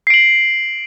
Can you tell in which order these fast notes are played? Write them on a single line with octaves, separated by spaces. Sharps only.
C7 D7 F#7